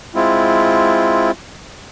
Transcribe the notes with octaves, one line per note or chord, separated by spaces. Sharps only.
G#3 C4 E4 F4